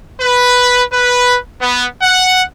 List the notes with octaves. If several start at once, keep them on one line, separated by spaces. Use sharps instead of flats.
B4
B4
B3
F#5